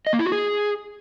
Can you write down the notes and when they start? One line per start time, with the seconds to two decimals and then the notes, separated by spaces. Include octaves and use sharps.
0.07 D#5
0.13 A#3
0.19 E4
0.26 F#4
0.32 G#4